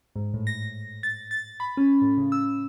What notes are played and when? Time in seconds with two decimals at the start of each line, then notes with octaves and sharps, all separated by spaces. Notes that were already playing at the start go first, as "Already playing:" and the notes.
0.16 G#2
0.34 A2
0.47 A#6
1.03 A6
1.31 A6
1.60 B5
1.77 C#4
2.02 A2
2.17 C#3
2.32 E6